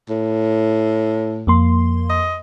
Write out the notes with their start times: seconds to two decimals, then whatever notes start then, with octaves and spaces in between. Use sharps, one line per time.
0.10 A2
1.47 F2 A#3 C6
2.10 D#5